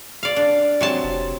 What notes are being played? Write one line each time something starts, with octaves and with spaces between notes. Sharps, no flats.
D5 F5
D4
C3 F#3 A5
F1